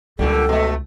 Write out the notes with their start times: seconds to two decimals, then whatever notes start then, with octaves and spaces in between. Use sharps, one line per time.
0.19 C#2 A#2 D3 G3 A4
0.49 B2 A3